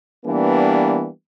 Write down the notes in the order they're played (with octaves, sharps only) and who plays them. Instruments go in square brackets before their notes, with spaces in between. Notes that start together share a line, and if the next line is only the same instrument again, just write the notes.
[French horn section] E3 G3 A#3 B3 D4